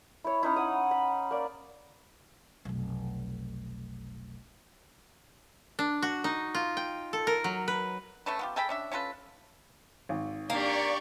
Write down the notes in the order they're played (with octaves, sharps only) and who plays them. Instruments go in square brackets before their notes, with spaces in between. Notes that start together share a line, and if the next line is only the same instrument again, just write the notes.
[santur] E4 C#5
C#4 D#4 E4
F#5 D#6
B5
A#3 D5
[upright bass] F1 B1
[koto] D4
F#4
D#4
F4
G5
A4
A#4
F#3
B4
[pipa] A3 C#4 A4 B4
B3 F4 G4
G#4 A4 G5 B5
C#4 D4 E5
C#4 F4 A4 B4
[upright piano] G#1
[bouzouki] A#3 [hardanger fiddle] D4 G4 [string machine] D5 C#6